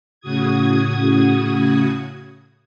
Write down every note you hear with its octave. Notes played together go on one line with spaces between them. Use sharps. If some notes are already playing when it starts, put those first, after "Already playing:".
A2 C#3 F#4 D#6 G#6